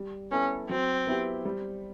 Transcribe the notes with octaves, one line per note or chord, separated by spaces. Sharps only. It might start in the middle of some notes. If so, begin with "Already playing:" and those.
Already playing: G3
B3 C#4 E4 A4
F#3 C4
B3 E4 G4
G3